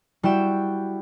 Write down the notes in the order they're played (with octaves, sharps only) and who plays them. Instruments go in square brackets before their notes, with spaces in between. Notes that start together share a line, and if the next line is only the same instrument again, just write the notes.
[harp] G3 E4 F#4 G5 E7